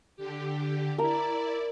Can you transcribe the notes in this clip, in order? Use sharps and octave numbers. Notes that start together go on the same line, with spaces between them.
D3 G4
E4 A#4 D5